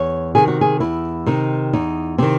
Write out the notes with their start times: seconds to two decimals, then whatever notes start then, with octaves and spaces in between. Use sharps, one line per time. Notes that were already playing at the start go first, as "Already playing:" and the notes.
Already playing: E2 C#5
0.35 C3 D#3 G#4
0.48 F#4
0.61 G#4
0.80 E2 E4
1.26 C3 D#3 D#4
1.73 E2 D#4
2.18 C3 D#3 C4